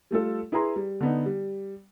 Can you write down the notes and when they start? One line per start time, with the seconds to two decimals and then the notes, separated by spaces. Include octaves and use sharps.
0.11 G3 A3 F4 A4
0.52 E4 G#4 B4 A#5 C6
0.76 G3
1.01 D3 B3 D#4
1.26 G3